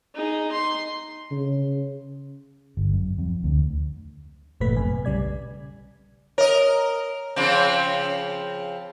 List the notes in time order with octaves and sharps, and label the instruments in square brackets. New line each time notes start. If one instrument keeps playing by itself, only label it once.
[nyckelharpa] D#4 G#4
C6
[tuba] C#3
[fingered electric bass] G1
F#2
F2
D2
[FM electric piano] G1 F2 A#2 A3 B4 B6
F#2 C3 B4 G#5
B1 C#3 G3 D5 G#6
[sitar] A#4 D#5 [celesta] C#5
[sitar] C#3 F3 C4